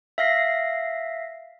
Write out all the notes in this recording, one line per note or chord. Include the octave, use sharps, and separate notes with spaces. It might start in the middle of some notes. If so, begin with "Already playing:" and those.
E5 F5 A#6 C7